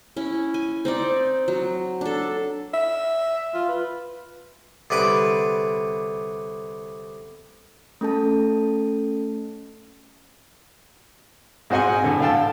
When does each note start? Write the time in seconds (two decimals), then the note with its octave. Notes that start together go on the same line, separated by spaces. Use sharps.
0.16 C#4 E4
0.54 G#5
0.85 C4 D#4 D5
1.48 F#3
2.01 D4 A4
2.74 E5
3.54 F4
3.69 B4
4.90 C2 D3 B4 D6
8.01 A3 C#4 A4 A5
11.70 G#2 C4 F#4 D#5 F#5 G#5
12.04 A2 D3
12.21 D3 F5 G5 A5